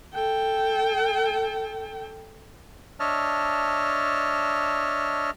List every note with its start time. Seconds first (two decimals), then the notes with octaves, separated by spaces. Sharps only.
0.14 A4 G5
3.00 D4 C#5 D#5 E5 A5 F6